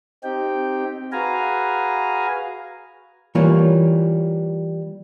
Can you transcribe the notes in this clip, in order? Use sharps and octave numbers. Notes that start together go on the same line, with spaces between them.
C4 D#4 G4 G5
F#4 G#4 B4 F5 G#5 A#5
E3 G3 A#3 F4 C#5